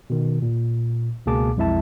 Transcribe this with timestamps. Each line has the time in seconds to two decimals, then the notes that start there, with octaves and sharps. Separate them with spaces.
0.10 B2 D#3
0.42 A#2
1.26 C#2 B2 A#3 G#4 A5 D6
1.57 B1 F2 G#3 E4 E5 A5